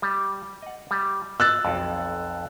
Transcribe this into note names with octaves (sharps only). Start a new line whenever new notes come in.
G3
D#5 F#5
G3
D#5 E6 F#6 A6
B1 F2